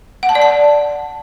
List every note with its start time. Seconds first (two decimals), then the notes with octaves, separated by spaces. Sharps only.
0.23 F#5
0.29 A5
0.35 D5
0.42 A5